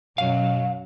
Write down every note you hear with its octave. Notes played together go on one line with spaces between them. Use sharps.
F#2 B2 F#3 F5